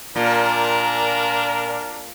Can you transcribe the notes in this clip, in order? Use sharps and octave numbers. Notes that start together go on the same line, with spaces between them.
A#2 D4 A#4